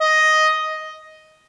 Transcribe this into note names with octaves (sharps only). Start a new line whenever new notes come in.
D#5